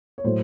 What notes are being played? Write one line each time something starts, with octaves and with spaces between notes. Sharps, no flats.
C#5
A2 F#3 A3 C5